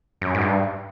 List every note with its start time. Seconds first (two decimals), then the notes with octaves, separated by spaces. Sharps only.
0.22 F#2
0.35 G#2
0.41 G2